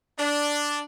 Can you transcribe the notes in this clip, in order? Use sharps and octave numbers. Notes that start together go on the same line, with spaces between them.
D4